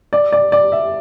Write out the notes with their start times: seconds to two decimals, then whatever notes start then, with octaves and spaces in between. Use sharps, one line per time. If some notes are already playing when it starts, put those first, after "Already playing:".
0.13 D5
0.32 D5
0.52 D5
0.72 E5